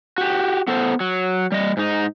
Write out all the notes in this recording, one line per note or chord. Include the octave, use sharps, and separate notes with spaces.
F#4 G4
B3 A4 C5
F#3
G3 D#5
G#2 D#4